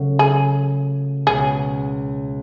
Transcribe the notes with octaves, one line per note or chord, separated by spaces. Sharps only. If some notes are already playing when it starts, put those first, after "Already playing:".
Already playing: C#3 F#3 A3 C#4
G#4
C#2 B2 G#3 C#4 G#4